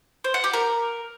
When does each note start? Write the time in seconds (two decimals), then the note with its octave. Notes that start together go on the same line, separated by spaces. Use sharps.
0.24 C5
0.34 F#5
0.44 G4
0.53 A#4